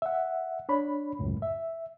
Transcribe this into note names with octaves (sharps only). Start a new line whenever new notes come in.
E5 F#5
D4 C#5 B5
C#2 F#2 A2
E5